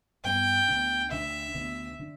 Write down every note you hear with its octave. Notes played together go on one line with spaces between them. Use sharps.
G2 G3 B3 G5
D2 D3 B3 D4
D2 D3 B3 D4 E5
D2 D3 B3 D4
D3 B3 D4